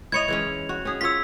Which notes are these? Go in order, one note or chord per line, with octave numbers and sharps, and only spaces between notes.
E4 C#5 D#5 G#6 C#7 F7
E3 G#3 C#4
F#4
C#4 G#4
F4 C#5 E6 B6